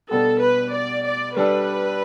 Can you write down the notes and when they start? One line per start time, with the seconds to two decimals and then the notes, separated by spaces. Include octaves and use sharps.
0.11 B2 G3 B3 D4 G4 A4
0.42 B4
0.73 D5
1.06 D5
1.37 G3 D4 A4 B4